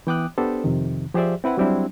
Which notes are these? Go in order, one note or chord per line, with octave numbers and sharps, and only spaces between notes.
E3 B3 G5 D6 D#6 F#6
B3 D4 G4 A4 C5
F2 C3 D#3
F3 G4 G#4 C5 D5 E5
C4 E4 B4 F#5
F#3 G3 C4 D4 E4